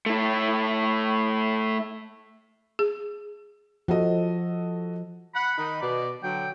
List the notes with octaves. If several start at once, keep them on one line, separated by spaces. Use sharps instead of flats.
A3 E4
G#4
F3 F#4 A4 D#5
F#5 B5
D#3 D#4
B2 D5
D3 F#3 G5